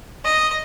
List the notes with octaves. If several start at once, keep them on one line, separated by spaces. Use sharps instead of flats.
D#5